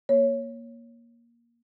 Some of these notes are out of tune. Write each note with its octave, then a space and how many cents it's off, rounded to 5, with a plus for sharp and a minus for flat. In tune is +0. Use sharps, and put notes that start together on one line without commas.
A#3 +10 C#5 +0